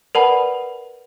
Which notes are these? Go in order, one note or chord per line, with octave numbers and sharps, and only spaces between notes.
A#4 B4 D5 F#5 A5 B5